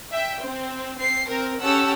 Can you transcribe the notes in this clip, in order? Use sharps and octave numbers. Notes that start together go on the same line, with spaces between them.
E5 G5
C4
C4 C7
C4 A#4
C#4 G4 A4 F#5 E6